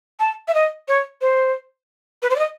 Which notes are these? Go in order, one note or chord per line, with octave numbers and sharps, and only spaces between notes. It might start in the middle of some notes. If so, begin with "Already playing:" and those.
A5
E5
D#5
C#5
C5
B4
C5
D5
D#5